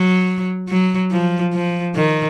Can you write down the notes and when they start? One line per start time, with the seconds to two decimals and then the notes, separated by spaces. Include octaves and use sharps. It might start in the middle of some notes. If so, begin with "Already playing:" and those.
Already playing: F#3
0.69 F#3
1.11 F3
1.53 F3
1.96 D#3